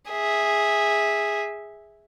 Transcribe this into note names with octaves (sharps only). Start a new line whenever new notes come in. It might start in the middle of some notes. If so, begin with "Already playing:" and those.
G#4 E5